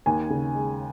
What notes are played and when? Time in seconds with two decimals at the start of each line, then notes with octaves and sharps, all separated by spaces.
0.06 D#2 G#5
0.30 C#3
0.54 G#3